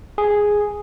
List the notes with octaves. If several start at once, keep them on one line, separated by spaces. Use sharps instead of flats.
G#4